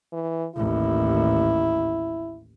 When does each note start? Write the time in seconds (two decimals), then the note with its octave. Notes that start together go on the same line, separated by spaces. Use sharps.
0.13 E3
0.56 A1 D#2 E4